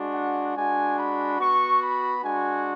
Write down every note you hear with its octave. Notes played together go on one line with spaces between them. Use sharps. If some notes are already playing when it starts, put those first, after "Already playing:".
Already playing: G#3 D4 F#4
F#5
G#3 D4 F#4 G#5
B5
B3 F#4 C#6
B5
G#3 D4 F#4 G#5